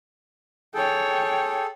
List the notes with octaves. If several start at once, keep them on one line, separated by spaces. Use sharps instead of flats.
G#4 A4 C#5 G5